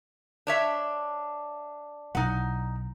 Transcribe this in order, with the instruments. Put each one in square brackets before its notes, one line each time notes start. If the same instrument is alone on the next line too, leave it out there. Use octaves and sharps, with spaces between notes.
[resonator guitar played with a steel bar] D4 C#5 E5
[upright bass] B1 E4 [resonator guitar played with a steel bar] D#4 F#5